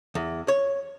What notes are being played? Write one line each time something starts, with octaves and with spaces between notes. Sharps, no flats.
E2
C#5